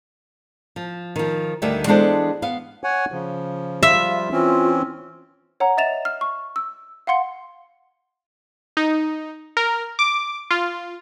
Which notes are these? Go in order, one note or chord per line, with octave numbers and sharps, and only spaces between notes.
F3
D#3 F3
D2 D3 D#3 G3 E5 G5
E3 G#3 B3 D4 A4 C5
B3 F5
C#5 F#5 G#5
C#3 F3
F3 G3 F4 E5 F5
E3 C4 C#4 F4
C#5 F#5 A#5
D#5 E5 A6 E7 F7
F6
C#6
E6
F5 F#5 C6 C#7
D#4
A#4
D6
F4